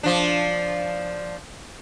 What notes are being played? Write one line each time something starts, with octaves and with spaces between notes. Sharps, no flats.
F3 D4